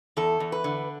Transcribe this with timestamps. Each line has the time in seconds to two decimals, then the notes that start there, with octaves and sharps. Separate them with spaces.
0.17 E2 A4
0.40 E2
0.52 B4
0.64 D3